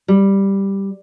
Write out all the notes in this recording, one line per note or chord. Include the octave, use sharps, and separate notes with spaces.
G3